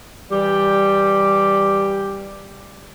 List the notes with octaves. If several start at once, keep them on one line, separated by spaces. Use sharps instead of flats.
E3 G3 G4